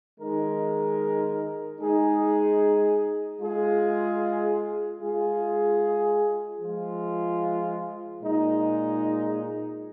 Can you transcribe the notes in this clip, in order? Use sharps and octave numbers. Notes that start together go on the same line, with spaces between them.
D#3 G#3 D#4 A#4
G#3 D#4 G#4
G#3 F4 G#4
G#3 F4 G#4
F3 G#3 F4
A#2 G#3 D#4